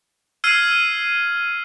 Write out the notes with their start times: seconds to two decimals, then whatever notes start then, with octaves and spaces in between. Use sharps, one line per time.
0.44 E6 F6 G#6 C7 D#7